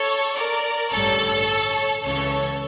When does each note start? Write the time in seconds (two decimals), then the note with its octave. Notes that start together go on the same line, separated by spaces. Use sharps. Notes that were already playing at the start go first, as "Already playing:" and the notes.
Already playing: A4 C#5
0.34 A#4 D5
0.91 A1 G2 D3 G3 A4 C#5
2.03 C#2 C#3 E3 A4 C#5